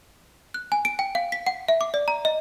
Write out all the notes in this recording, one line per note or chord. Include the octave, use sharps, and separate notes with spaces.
F#6
G#5
D7
G5
F5
B6
F#5
E5
D6
D5
A#5
D#5